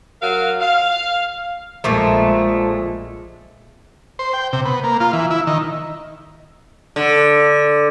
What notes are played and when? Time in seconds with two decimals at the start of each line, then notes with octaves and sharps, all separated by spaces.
0.22 F#3 A#4 F5
0.61 F5
1.84 A#1 A#2 F3 G#3 A3
4.19 C5
4.33 G5
4.53 C3
4.65 B3
4.84 A#3
5.00 F4
5.13 E3
5.31 E4
5.47 D#3
6.96 D3